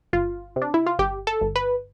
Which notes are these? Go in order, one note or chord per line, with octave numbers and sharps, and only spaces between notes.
G1 F4
C3
D4
E4
F4
G1 G4
A4
G1
B4